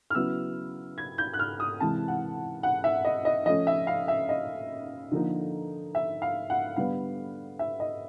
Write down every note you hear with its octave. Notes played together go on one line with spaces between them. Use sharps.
F6
C#3 F#3 B3 E4 E6
G#6
G6
F#6
F6
D#6
C3 E3 G#3 A5
F#5
F#5
E5
D#5
D#5
F3 A3 C#4 D#5
E5
F5
E5
D#5
D3 F3 A#3 D#4
E5
F5
F#5
D3 G3 B3 F5
E5
D#5